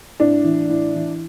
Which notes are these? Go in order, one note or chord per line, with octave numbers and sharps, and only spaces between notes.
A2 D4
E3
A2
E3